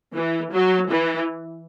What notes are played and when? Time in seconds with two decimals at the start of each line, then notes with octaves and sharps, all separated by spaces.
0.15 E3
0.53 F#3
0.91 E3